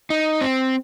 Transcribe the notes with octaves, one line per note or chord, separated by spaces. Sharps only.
D#4
C4